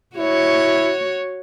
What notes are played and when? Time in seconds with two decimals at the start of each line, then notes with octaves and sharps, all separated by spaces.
0.16 E4 F#4 C#5